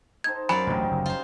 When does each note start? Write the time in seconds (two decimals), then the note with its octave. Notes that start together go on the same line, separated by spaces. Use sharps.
0.24 D#4 A4 C5 G#6
0.49 F#2 F#3 D5 F5 G#5 B5
0.67 A1 D2 A#2 G3 D#4
0.91 F#1 D2
1.06 F4 C5